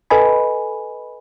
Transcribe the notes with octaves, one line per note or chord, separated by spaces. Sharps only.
A4 B4 D#5 G#5 B5